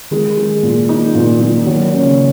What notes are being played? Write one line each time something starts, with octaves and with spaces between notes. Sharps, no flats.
D#3 G#3
G#3
A#2
D#4
A#2
A#2
D#3 F#3
C#4
C#3